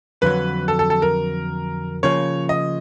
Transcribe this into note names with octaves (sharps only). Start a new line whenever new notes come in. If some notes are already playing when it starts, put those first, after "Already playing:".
F2 D3 F#3 B4
A4
A4
A4
A#4
C#3 F3 A#3 C#5
D#5